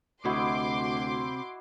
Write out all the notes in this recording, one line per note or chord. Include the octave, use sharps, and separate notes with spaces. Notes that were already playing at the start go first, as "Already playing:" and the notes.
D2 C3 C4 E4 F#4 D#5 C6 D6